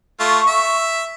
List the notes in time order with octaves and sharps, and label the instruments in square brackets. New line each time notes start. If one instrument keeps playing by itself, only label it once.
[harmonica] A3 F4 [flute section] C#6
[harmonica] E5